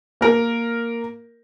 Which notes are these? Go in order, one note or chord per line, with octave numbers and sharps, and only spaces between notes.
A#3 A#4